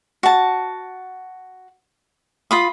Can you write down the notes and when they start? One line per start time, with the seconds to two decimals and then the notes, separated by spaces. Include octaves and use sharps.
0.23 F#4 A5
2.51 F4 B5 D#6